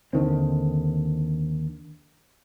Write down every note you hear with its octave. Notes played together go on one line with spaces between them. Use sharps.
D#2 D3 D#3 C4